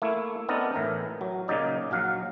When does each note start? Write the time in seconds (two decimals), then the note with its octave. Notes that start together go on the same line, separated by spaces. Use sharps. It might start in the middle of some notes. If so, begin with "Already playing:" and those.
0.02 A3 A#3 E4
0.49 B3 C4 D4 D#4 A4 A#4
0.73 A2 E3 A#4 A#5
1.21 F#3
1.48 A#2 C#3 F#3 D#4 D5
1.91 A#1 F#3 F5 F#5